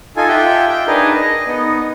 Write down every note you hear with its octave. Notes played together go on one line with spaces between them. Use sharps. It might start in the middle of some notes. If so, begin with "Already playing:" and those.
D#4 F4 A4 G#5
F4 G4 E5 F#5 G5
G5
D4 D#4 G#4 A#4 B4
D#5
B3 D#4